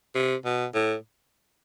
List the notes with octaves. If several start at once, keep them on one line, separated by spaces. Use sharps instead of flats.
C3
B2
A2